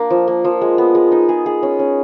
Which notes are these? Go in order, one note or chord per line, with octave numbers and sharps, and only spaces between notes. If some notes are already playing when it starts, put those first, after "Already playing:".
Already playing: A#3 D4
F3
A#3
F3
G#3
B3
G#3
D#4
G#4
G#4
C#4
C#4